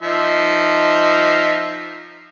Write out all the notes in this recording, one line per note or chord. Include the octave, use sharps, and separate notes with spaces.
F3 D#4 E5